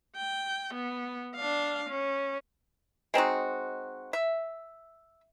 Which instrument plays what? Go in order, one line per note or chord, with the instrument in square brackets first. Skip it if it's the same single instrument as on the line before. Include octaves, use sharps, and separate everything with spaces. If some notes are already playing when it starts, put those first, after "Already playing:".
[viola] G5
B3
D4 F5
C#4
[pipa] G#3 C4 D#4 F#4
E5